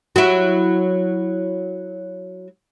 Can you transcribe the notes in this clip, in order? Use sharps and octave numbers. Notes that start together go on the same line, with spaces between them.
F#3 E4